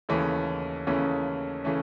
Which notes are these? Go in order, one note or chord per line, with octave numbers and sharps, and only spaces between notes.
D#2 C#3 E3 A3 C#4
D#2 C#3 E3 A3 C#4
C#3 E3 A3 C#4